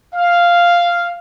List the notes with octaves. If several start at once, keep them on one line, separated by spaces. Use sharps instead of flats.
F5